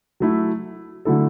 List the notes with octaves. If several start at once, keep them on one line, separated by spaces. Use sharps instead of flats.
F#3 A3 E4
D3 F#3 A3 E4 A4